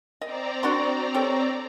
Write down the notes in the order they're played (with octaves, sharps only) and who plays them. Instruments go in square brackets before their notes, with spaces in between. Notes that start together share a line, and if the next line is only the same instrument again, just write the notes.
[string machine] C4 D5 A#5 [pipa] D#5
[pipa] D4 F#4 C6
G4 A4 C#5